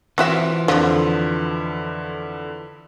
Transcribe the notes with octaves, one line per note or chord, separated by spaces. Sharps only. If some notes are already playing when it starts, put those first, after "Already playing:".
E3 C4 F4 F#4 E5
F2 D3 F3